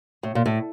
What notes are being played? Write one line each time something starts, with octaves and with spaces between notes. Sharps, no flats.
A2
A#2
A2